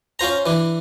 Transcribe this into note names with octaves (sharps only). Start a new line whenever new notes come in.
C#4 F4 C5 A#5
E3 D4